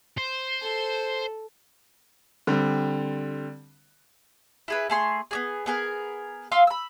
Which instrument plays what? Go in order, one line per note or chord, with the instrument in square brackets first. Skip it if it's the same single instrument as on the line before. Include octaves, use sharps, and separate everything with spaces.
[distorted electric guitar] C5
[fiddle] A4
[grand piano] D3 G3 C4
[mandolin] E4 G#4 B4
A3 G#4 C6
B3 G4 G#4
B3 G#4 A#4
F4 F5 C6 E6
B5 E6